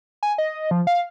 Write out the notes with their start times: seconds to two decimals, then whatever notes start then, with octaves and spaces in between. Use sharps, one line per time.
0.23 G#5
0.38 D#5
0.71 F3
0.87 F5